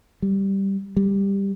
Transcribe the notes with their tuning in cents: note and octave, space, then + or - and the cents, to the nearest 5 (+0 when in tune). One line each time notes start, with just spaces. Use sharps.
G3 -5
G3 +10